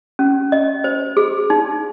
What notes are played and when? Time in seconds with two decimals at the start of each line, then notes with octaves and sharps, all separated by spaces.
0.19 C#4
0.52 D#5
0.84 C5
1.17 G#4
1.50 D#4